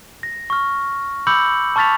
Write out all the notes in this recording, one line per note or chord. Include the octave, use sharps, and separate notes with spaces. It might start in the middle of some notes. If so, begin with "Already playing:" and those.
A#6
C#6 F6
B5 D6 E6 G6 C#7 F#7
A5 C#6 F6 A6 B6 F7